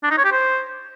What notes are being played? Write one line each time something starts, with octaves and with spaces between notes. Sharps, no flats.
D4
D#4
C#5
G4
C5